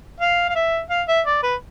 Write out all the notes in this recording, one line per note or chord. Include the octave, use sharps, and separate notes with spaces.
F5
F5
E5
F5
E5
D5
B4